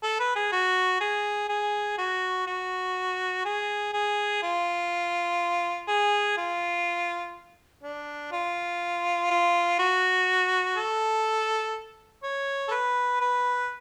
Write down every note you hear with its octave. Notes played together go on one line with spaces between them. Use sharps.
A4
B4
G#4
F#4
G#4
G#4
F#4
F#4
G#4
G#4
F4
G#4
F4
D4
F4
F4
F#4
A4
C#5
A4
B4
B4